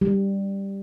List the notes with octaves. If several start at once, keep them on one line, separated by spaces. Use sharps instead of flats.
G3